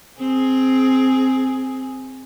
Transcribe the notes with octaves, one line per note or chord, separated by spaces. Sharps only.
C4 G#4